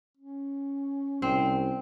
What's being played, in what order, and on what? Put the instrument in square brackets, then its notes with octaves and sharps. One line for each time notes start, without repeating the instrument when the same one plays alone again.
[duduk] C#4
[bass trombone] C2 [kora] C4